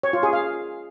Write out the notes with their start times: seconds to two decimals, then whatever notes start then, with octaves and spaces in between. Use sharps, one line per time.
0.03 C#5
0.13 F4
0.23 G#4
0.33 F5